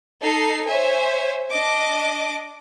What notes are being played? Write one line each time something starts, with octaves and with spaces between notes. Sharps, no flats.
D#4 A4 C7
C5 C#5 E5 G#5
D4 D#5 D6